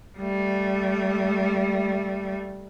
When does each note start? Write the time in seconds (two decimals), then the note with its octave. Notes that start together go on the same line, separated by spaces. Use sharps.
0.18 G3 A3